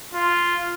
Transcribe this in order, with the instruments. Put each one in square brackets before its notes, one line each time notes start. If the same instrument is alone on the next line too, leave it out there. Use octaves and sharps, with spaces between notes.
[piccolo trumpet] F4